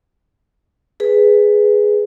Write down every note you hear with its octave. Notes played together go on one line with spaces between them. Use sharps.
G#4 B4